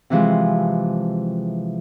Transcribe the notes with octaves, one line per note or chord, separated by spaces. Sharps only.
C3 E3 F3 G#3